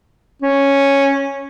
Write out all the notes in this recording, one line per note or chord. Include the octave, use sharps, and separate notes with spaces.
C#4